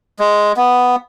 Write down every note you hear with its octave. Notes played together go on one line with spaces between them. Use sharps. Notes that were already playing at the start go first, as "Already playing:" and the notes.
G#3
B3